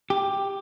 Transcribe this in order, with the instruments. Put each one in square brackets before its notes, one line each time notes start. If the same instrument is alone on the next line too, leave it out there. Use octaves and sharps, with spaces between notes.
[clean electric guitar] G4